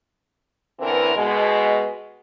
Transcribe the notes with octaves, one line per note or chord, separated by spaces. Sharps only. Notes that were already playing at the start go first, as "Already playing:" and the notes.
D3 E3 B3 C4 E4 A#4
B2 G#3